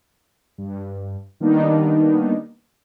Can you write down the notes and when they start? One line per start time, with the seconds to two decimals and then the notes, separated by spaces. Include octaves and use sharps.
0.58 G2
1.40 D#3 G3 A#3 B3 D4 D#4